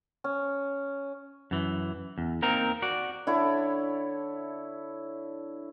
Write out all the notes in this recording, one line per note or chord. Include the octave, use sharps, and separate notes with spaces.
C#4
F#2 E3
E2
A#3 C4 D#4 A#4
F#4 D5
D3 E4 A4 C#5